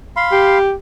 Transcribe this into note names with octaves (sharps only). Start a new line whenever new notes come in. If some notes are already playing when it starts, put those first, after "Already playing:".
F5 B5 C6
G4